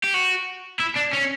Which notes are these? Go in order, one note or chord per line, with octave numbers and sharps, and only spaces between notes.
G4
F#4
E4
D4
C#4